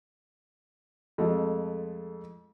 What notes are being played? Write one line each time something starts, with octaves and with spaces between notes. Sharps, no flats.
F2 G#3 A3